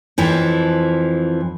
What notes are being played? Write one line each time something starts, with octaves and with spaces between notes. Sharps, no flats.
F2 E3 F3